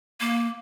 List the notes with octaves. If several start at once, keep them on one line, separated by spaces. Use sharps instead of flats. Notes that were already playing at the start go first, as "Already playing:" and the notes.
A#3